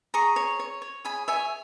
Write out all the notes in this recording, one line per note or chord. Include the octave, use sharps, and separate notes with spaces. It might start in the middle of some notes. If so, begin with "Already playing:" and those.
G#4 A#5 C#6
C#5
C#5
C#5
G#4 G#5 B5
C#5 E5 G#5